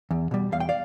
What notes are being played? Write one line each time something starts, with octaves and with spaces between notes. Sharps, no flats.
E2
B2 G3
E2 F5
G5
D5 F5